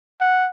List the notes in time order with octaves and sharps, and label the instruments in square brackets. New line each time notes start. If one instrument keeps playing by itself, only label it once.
[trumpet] F#5